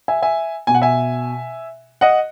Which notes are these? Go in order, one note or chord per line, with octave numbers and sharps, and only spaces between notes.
E5 G#5
E5 G#5
B2 G#5
F#5
E5 G#5
D#5 F#5